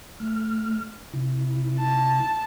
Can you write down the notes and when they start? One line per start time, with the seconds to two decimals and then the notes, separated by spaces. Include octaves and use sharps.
0.20 A3 F6
1.13 C3 E4
1.79 A5